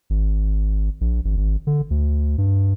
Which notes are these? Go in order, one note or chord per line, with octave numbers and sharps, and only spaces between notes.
G#1
A#1
G#1
G#1
D3
D2
G2